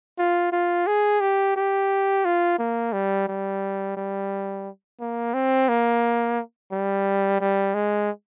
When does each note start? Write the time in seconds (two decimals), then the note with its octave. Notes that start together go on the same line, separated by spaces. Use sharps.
0.19 F4
0.52 F4
0.87 G#4
1.21 G4
1.56 G4
2.25 F4
2.59 A#3
2.93 G3
3.28 G3
3.97 G3
5.00 A#3
5.34 C4
5.69 A#3
6.72 G3
7.40 G3
7.74 G#3